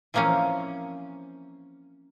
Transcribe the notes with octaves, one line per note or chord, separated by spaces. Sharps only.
E3 F3 A#3 C4 C#4